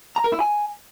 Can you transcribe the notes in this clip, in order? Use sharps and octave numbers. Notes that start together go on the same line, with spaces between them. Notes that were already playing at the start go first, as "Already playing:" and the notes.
A#5
A#4
E4
G#5